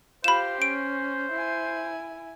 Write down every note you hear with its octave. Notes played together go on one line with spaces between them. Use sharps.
F4 G4 C5 B5 E7
C#4 D7
E4 G#5